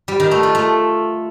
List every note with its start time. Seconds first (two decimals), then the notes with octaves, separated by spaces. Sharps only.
0.08 G3
0.20 D#3
0.31 A3
0.43 F4
0.55 A3